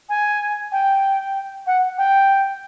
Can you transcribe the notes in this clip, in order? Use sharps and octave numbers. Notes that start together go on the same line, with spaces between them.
G#5
G5
F#5
G5